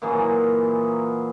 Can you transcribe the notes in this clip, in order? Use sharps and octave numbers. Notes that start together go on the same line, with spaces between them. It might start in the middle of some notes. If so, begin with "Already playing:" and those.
A#2 E3 F#3 G#4